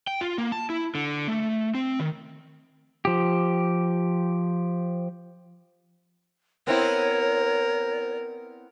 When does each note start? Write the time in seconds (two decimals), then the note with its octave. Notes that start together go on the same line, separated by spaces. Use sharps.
0.07 G5
0.21 F4
0.38 A#3
0.52 A5
0.70 E4
0.95 D3
1.28 A3
1.75 C4
2.00 D#3
3.05 F3 G4
6.67 B3 C4 E4 A#4 C#5